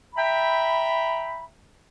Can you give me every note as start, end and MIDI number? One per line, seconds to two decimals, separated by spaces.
0.16 1.47 76
0.16 1.47 79
0.16 1.47 82
0.16 1.47 83